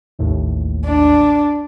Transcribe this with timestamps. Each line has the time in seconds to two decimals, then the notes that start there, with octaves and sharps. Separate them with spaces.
0.19 A1 D#2 A2
0.85 D4